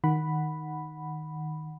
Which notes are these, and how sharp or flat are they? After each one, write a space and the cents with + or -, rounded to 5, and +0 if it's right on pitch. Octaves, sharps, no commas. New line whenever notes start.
D#3 +0 F#5 +0 B5 +0